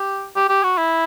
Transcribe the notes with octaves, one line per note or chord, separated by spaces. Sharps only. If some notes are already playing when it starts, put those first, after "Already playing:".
Already playing: G4
G4
G4
F#4
E4